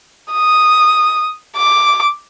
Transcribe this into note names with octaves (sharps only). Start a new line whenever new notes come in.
D#6
D6